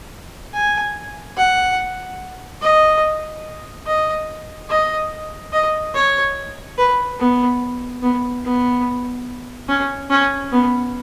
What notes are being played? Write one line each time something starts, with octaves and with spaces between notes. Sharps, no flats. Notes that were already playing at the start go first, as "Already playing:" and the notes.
G#5
F#5
D#5
D#5
D#5
D#5
C#5
B4
B3
B3
B3
C#4
C#4
B3